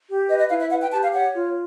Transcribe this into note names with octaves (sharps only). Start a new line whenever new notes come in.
G4
B4 D#5
D#5
E4 F5
E5
B4 F#5
G5
G4 A5
F5
C#5 F#5
F4